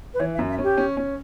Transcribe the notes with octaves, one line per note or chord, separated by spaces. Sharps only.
B4
E3 C#5
E5
F#2
E5
C#4 G4
C#4
C#4